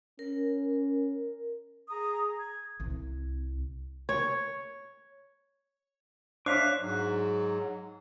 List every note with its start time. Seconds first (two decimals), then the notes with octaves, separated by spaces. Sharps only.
0.19 C#4 A#4
1.89 G#4 A#5 D#6
2.39 G#6
2.80 C2
4.09 C#5
6.46 D4 C5 C#5 E5 F5 D6 F#6
6.80 G#2 F#3